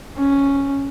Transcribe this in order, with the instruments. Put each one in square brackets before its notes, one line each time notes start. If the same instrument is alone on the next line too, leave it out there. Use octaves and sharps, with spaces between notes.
[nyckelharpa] C#4